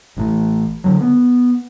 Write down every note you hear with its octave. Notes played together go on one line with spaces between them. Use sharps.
A1 E3 A3
D3 F#3
B3